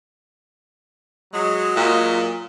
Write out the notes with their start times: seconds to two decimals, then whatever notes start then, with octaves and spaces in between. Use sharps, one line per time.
1.32 F#3 G#3
1.76 A#2